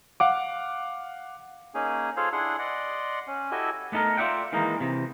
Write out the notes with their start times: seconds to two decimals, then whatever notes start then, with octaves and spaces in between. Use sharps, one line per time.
0.20 F5 F#5 D6
1.75 A#3 C#4 D#4 G#4
2.17 F4 G#4 A4 C5 C#5 F5
2.32 D4 E4 G#4 F#5 C6
2.59 D5 D#5 F#5 C6
3.27 C#4
3.51 E4 F#4 G4 A4 D#5 G#5
3.92 A3 B3 D#4 A4 A#4
4.17 F4 D5 E5 F#5 G5
4.52 D#3 E3 G#3 A#3 D#4
4.80 C3 E3